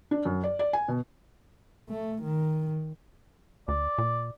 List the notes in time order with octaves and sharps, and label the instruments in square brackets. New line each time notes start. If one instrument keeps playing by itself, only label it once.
[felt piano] D4
F#2
D5
D5
G#5
B2
[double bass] A3
D#3
[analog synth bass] D2 [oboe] D5
[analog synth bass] A#2